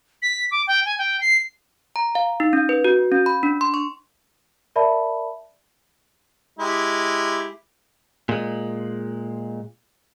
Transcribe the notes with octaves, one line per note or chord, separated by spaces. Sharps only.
B6
D6
G5
G#5
G5
C7
A#5
F5
D#4
C#4
B4
F#4
C#4
B5
D4
C6
C#6
A#4 D5 E5 A5 B5
G#3 E4 G4
A#2 G#3